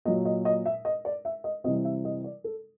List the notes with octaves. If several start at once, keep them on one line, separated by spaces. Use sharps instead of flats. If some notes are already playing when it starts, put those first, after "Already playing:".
A#2 F#3 D#5
D#5
D#5
E5
D#5
D5
E5
D#5
C3 E3 G3 D#5
E5
D#5
D5
A4